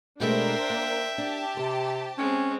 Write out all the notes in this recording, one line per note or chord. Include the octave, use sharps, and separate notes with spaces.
B2 G#3 A3 D4 A#4 C5 E5 G5
A#3
D4 G4 A5
C3 C5
G#3 C4 C#4